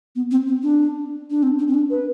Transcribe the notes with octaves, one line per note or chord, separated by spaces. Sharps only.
B3
C4
C4
D4
D4
C4
D4
C4
D4
B4